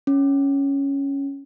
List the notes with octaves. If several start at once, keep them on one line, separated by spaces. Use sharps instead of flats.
C#4